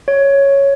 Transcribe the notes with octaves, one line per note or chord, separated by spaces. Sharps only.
C#5